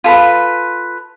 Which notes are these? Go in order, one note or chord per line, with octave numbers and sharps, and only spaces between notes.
F4 A4 B4 B5